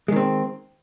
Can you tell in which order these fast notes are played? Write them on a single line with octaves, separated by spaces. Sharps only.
G#3 D#3 C4